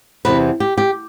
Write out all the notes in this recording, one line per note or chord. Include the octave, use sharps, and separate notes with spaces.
E2 C3 E3 B4
G4
G4